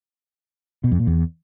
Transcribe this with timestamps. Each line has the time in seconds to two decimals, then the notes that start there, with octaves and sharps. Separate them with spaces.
0.84 B2
0.92 F2
0.99 A#2
1.07 E2